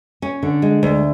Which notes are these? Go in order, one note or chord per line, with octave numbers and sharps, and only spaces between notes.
C#4
D3
G#3
D2